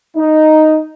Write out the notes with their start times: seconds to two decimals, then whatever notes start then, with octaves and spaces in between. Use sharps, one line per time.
0.17 D#4